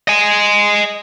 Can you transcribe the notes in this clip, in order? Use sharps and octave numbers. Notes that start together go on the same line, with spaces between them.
D#5 G#5